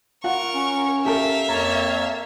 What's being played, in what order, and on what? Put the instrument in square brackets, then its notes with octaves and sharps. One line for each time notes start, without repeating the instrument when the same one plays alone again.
[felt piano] F4 F#5 [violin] A#4 C#6
[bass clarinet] C#4
[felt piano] G4 A4 A#4 [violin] E5 F5
[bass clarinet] F2 [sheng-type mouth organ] A#3 C#5 A5 [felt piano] A#5